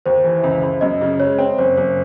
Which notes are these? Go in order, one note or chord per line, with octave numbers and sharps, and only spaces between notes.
D#2 C5
E3
C#2
C#2
F#2 D#5
C#3
G#3 C#5
C4
F#1 C5
F#1